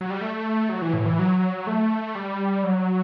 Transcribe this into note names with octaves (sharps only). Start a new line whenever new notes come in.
F#3
G3
A3
F#3
E3
A2
E3
F#3
A3
G3
F#3